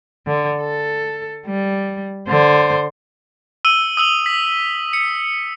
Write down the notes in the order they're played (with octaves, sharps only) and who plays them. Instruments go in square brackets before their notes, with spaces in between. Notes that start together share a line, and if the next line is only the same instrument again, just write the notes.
[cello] D3
A4
G3
D3 C5
[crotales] E6 D#7 G7
D#6 E6 F#7 G7
B6
C#7